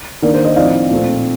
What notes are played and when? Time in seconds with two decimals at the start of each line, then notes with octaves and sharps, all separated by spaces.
0.22 D#3 A#3 D4 A#4 D5
0.34 C5
0.45 C5 D#5
0.56 A2 F3 C4 D#4 D5 F5
0.90 A#2 A3 C4